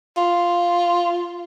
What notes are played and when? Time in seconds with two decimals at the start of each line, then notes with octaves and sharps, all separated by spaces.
0.17 F4